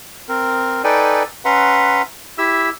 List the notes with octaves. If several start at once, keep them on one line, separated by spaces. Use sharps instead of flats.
C4 A#4
D#4 A4 B4 D5 G5 G#5
C#4 B4 E5 F#5 A#5 C6
E4 G4 E5 E6